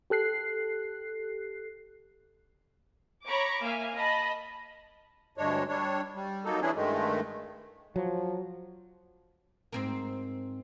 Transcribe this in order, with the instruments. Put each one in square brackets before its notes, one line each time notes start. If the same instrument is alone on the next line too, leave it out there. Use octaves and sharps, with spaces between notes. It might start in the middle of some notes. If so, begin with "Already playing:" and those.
[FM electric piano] G4 A4 F#6 C7
[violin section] C#5 A#5 B5 C#6 D6
A#3 E5 F5 G#5
D#5 A5 B5
[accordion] D2 G2 G#3 D4 C#5
G3 D4 C#5
G3
F#3 A#3 D#4 A4
E3 C#4 D4 E4 G#4
G2 D#3 G#3 A3
[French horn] F3 [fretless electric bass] F#3
[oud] G#2 C4 A#4